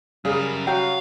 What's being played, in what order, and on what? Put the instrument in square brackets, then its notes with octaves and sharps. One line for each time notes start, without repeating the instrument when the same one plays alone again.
[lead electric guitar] F#2 A#4 [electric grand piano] C#3 G3 [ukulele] G#4 D5 F5
[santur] F#3 [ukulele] F#4 G5 [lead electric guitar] F5